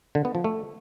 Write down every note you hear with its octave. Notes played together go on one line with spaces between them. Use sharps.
D3
B3
F3
A3